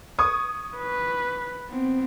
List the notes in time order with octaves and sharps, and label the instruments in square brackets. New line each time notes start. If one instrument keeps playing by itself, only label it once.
[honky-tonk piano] C#6 D#6 G#6
[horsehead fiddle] B4
B3 C4